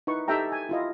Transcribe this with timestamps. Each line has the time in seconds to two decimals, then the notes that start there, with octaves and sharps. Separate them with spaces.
0.07 D#4 E4 B4 C#6
0.28 D#4 G4 A4 E5 G5 A#5
0.52 G#5
0.69 E4 F4 D#5